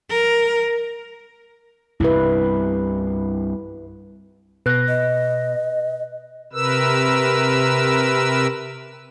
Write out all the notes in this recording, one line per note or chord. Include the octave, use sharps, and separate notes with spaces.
A#4
C2 G2 C3 E4 B4
B2 B4 F#6 A#6
D#5
C3 A#4 B4 E6